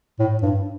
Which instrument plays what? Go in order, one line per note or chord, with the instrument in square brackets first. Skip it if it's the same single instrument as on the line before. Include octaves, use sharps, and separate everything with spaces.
[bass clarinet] A2
G2